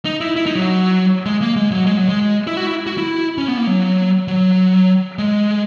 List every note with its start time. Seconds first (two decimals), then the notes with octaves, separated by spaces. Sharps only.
0.05 D#4
0.21 E4
0.36 E4
0.46 D#4
0.56 F#3
1.26 G#3
1.42 A#3
1.56 G#3
1.72 F#3
1.87 G#3
1.97 F#3
2.09 G#3
2.47 E4
2.57 F#4
2.66 E4
2.87 F#4
2.98 E4
3.38 C#4
3.48 B3
3.57 A#3
3.67 F#3
4.28 F#3
5.18 G#3